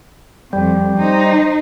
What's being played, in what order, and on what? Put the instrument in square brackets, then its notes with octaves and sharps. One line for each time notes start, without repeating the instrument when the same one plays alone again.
[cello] F2 [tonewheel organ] G3
[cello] D#4 C5